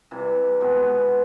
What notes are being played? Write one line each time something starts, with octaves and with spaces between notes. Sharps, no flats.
C3 E3 G3
B2 G#3 B3